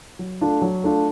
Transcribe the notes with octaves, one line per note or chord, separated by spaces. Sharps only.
F#3
A3 D4 F4
F#3
A3 D4 F4